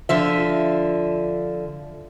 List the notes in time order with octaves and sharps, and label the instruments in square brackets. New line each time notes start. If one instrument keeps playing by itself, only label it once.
[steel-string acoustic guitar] D3 F3 E5